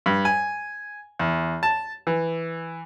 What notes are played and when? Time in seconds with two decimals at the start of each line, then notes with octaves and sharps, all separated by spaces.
0.06 G2
0.25 G#5
1.19 E2
1.63 A5
2.07 E3